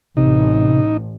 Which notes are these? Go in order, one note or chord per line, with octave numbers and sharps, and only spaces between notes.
A1 C3 D#4